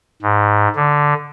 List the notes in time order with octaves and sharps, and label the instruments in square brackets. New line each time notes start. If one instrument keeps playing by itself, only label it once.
[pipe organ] G#2
D3